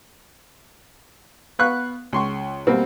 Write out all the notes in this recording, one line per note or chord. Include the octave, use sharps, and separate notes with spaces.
B3 B4 F5 C#6 F#6
C#2 C6 C#6
B2 G3 A#3 C4